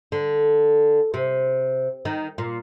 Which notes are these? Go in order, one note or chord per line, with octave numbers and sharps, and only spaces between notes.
D3
C3
D#3
A#2